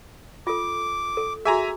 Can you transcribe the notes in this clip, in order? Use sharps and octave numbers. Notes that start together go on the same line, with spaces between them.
F4 A4 D6
A4
F#4 G#4 E5 G#5 A#5